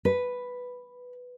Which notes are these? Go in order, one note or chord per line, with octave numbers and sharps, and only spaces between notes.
B4